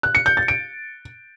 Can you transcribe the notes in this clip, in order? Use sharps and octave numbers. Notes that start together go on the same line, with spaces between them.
F#6
C#7
G6
A6
D7